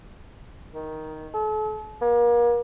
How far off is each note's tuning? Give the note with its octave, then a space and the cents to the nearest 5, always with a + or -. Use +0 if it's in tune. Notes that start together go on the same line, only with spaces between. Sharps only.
D#3 +5
A4 -40
A#3 +35